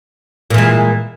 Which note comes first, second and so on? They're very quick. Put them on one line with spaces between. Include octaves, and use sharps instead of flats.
A#2 E3 G#3